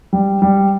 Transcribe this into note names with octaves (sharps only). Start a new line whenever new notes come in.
G3
G3